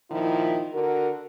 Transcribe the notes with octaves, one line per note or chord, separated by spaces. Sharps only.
A#2 D#3 F3 E4
D3 F#4 A#4